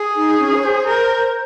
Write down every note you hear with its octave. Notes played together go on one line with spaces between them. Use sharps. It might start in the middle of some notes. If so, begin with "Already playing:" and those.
Already playing: G#4
D#4
C#4
C#5
C5
A#4